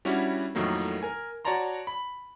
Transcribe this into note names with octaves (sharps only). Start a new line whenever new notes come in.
G3 C#4 D4 E4 F#4
F2 A2 D#3 F#3 A3 A#3
A#4 G#5
F#4 C#5 D5 A5 A#5 C6
B5